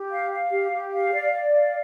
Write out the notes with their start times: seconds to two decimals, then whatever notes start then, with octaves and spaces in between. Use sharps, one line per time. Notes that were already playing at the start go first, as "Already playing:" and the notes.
Already playing: G4
0.11 F5
0.31 F5
0.51 G4
0.72 G4
0.92 F5
1.12 D5
1.33 D5
1.52 F5